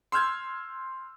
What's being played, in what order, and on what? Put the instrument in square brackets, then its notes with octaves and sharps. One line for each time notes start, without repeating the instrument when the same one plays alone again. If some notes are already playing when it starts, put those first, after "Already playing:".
[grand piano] C6 E6 F6 G6 G#6